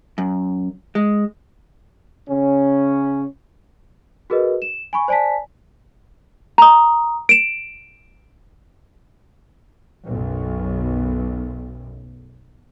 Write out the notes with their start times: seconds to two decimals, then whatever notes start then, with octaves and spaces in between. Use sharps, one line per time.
0.18 F#2
0.95 G#3
2.30 C#3 C#4
4.30 F#4 G#4 A#4 B4 D#5
4.62 E7
4.93 G#5 B5 C#6
5.08 C5 D5 G#5 A5 B6
6.58 A#5 D#6
7.29 D7 E7
10.07 B1 F#2